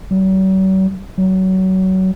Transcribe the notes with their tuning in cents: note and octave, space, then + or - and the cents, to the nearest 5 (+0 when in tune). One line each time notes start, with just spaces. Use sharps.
F#3 +45
F#3 +25